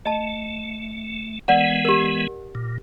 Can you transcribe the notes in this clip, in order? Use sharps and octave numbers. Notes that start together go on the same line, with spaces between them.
A3 D#5 A5
E3 G#3 B3 A#4 D5 F#5
G4 A#4
A#2